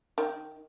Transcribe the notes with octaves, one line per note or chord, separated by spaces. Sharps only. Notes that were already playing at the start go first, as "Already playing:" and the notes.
D#3